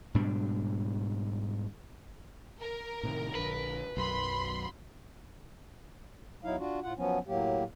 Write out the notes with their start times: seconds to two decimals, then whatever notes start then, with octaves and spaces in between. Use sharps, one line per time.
0.14 G#2 B2 G3 D4
2.60 A#4
3.03 A2 C3 D#3
3.35 A#1 D3 B4
3.97 B1 F#2 B5 C6
6.44 E2 F#3 D#4 E4 F5
6.58 D4 F4 F#4
6.83 A2 F4 F#5
6.97 F3 F#3 B3 C#4
7.27 A2 F#3 A#3 G4